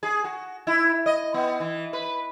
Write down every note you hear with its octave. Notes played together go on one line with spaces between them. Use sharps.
G#4
F#4
E4
D#5
B3
E3
B4